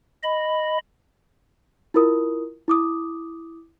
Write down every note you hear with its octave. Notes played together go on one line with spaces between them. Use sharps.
D#5 B5
E4 F4 A#4 D#6
E4 D6 D#6